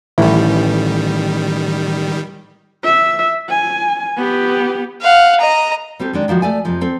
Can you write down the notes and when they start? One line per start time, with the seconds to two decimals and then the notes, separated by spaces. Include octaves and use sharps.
0.18 A1 D#3 G3 E4
2.83 E5
3.49 G#5
4.17 B3 G4
5.01 F5 F#5
5.40 D#5 A#5
5.99 G3 C4 G4 A4
6.13 D#3 G#3 D4
6.28 D#3 F3 G3 F#4
6.42 A3 D5 G#5
6.65 F2 C3 F3
6.81 C4 A4